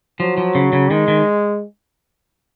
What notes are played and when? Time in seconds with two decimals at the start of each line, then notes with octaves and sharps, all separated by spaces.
0.20 F3 F#3
0.38 F3
0.55 C#3
0.73 C#3
0.91 D#3 G#3
1.08 D#3